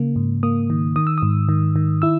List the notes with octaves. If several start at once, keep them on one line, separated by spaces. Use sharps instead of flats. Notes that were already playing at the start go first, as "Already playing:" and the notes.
Already playing: C#3 A#3
G#2
A#3 D#6
D#3
D#3 D#6
E6
G#2 D#6
D#3
D#3
E4 E6